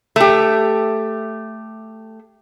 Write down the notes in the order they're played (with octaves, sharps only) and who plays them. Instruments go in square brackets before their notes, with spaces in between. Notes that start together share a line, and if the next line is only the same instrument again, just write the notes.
[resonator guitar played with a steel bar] A3 G4